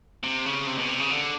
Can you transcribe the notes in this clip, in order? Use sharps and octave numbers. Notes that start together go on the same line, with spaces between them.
C3
C#3
C3
B2
C3
C#3
D3